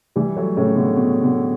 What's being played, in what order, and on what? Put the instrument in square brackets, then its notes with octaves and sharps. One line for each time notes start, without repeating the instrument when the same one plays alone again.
[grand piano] E3 G3
F#3 A3
A2 C#3
B2 D3
B2
B2 D3